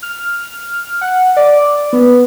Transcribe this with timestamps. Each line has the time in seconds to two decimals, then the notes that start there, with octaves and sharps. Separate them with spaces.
0.03 F6
1.01 F#5
1.37 D5
1.93 B3